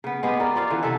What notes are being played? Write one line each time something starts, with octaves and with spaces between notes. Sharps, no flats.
C#3 B3
G#3 B3 G4
G4 A#4 D5
F4 D5 F5
D3 E3 C#4
C3 A4 E5 F#5